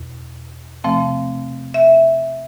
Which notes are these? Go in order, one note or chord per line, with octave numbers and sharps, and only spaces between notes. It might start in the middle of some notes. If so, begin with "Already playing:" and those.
Already playing: E2 B2
C3 F3 A3 C4
E5